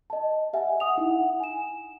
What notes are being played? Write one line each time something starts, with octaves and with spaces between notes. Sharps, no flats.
D#5 A5
G4 E5 F#5 G#5
F#5 D#6 F7
D#4 E4 F#5
F#5
G#5 E7